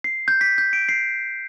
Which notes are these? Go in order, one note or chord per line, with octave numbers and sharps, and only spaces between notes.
C7
G6
B6
G6
D7
C7